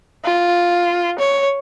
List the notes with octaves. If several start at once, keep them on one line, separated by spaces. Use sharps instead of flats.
F4
C#5